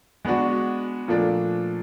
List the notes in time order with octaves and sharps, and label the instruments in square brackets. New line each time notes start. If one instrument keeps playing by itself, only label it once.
[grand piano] G#3 B3 D4 F#4
A#2 F3 A3 D4